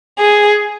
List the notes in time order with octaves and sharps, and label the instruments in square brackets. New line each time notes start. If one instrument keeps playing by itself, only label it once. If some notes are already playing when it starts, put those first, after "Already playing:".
[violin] G#4